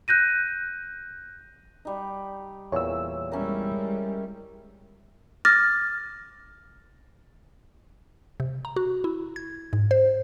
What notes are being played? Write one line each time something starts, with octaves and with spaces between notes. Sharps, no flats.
F#6 G6 A#6 D#7
G3 D#4
E2 A#2 C#5 E6
G3 G#3 C#4 E4 A#4
D6 F6 A6 A#6
C3
A#5
F#4
E4
G#6
G#2
C5